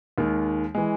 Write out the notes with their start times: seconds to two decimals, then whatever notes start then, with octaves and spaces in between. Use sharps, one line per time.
0.18 D#2 D#3 G#3
0.75 E3 G#3